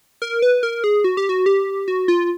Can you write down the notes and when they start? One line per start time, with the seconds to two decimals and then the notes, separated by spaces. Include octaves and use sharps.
0.22 A#4
0.42 B4
0.63 A#4
0.84 G#4
1.04 F#4
1.17 G4
1.29 F#4
1.46 G4
1.88 F#4
2.08 F4